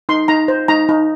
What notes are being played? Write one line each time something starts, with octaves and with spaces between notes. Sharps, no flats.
D#4 C6
D#4 A#5
C5
D#4 A#5
D#4